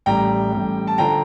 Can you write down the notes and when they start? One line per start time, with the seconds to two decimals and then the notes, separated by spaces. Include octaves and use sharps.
0.06 A1 A2 G3 G5 A#5
0.52 A1 A2 G3
0.87 A5
0.98 D3 F3 G5 A#5